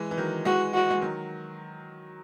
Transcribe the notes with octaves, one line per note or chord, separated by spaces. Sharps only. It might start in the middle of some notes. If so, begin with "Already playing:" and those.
Already playing: E3 G#3
E3
D#3 F#3
E3 G#3 F#4
F#4
G#3
D#3 F#3